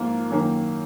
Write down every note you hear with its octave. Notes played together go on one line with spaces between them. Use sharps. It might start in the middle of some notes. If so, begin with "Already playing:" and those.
Already playing: G#2 F3 A#3 F4 A#4
F#2 D#3 A#3